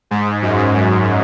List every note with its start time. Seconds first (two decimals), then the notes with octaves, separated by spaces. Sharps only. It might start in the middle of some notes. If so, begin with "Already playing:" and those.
0.11 G#2
0.42 F#2
0.75 G#2